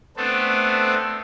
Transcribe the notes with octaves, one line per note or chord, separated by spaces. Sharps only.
A3 B3 C4 D4 A4